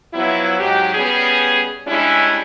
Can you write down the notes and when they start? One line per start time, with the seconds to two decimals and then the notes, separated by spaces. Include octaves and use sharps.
0.13 F3 F#3 B3 E4
0.58 G#2 F#3 G4
0.94 G3 B3 C#4 G#4
1.87 G3 G#3 C#4 D4 E4